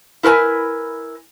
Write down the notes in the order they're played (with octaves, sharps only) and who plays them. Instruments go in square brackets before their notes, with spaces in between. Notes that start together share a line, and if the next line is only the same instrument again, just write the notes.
[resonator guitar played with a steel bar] E4 A#4 B4 G#5